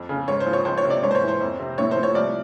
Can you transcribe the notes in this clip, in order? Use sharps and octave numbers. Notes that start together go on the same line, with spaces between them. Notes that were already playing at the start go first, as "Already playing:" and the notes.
Already playing: F2
C#3
G#2 C#5
C5
F3
C#5
C#2 C5
C#5
C3
D5
G#2 C#5
C5
C#5
E3
C5
F2
C3
A2 C#5
C5
F3
C#5
C2 D5